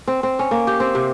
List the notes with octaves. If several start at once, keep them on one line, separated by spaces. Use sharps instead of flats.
C4
C4
C#4
A#3
G4
C4
C3